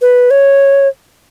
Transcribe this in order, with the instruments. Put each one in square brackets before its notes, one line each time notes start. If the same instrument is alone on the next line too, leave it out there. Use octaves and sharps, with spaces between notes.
[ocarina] B4
C#5